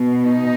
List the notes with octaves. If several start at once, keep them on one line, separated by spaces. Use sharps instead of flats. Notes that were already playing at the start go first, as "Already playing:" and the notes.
Already playing: B2
D#4